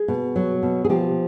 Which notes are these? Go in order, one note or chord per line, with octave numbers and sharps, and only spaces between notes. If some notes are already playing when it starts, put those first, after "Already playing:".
Already playing: G#4
B2
F#3
B2
G#4
F3 G4